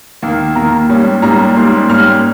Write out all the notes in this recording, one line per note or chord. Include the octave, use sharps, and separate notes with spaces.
D#2 D#3 A#3
D#2 D#3 A#3 A#5
G#2 G3 A#3 C#4
G#2 G3 A#3 C#4 A#5
G#2 G3 A#3 C#4 C6
G#2 G3 A#3 C#4 F6